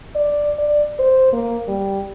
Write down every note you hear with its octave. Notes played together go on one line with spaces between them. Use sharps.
D5
D5
C5
A#3
G3